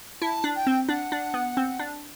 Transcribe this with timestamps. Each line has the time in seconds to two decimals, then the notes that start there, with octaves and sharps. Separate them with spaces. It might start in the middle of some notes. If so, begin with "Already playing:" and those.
0.21 E4 A5
0.44 D4
0.55 G5
0.67 C4
0.89 D4 F#5
1.12 D4
1.34 B3
1.57 C4
1.79 D4